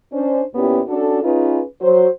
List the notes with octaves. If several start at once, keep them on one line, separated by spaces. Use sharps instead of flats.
C#4 D4 C5
A#2 B3 C#4 E4 G4
C#4 D4 F#4 A4
C#4 D#4 F4 G#4 B4
F#3 C5